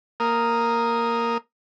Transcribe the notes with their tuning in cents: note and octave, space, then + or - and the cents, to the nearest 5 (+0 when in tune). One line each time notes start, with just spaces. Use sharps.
A#3 +0 A#4 +0 D#6 +0